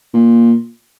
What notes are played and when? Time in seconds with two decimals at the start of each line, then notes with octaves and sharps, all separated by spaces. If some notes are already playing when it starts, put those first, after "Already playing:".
0.14 A#2